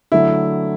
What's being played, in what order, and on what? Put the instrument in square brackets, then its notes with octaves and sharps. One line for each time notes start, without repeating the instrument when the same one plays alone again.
[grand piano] D3 F#3 A3 [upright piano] E4